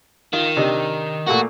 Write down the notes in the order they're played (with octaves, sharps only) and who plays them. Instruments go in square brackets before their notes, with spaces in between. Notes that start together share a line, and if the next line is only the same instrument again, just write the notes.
[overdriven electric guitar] D#3 [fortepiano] F4
[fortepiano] C3 D4 D#5
[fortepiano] A#2 A3 A#3 [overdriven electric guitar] F#4